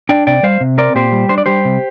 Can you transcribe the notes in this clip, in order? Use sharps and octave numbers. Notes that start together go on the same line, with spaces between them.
D4 D5 G5
C3 D5 G5
G3 C5 F5
C3
C4 A#4 D5
A#2 G4 C5
G3
D4 C5
D5
G3 G4 C5
C3